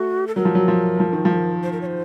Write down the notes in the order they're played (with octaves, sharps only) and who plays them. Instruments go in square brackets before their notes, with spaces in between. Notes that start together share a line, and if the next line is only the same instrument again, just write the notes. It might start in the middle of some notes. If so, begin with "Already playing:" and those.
Already playing: [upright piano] A3 [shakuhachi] F#4
[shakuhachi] A4
[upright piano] F#3 [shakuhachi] A#4
[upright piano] F3
F#3
F3
F3
D#3
F3
[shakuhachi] C5
A#4
C#5
C5